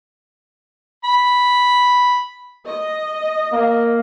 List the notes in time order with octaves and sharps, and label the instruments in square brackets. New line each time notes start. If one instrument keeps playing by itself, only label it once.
[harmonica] B5
[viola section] D#5
[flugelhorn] A#3